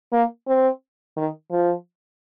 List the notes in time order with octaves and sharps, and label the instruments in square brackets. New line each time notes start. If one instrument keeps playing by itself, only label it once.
[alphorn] A#3
C4
D#3
F3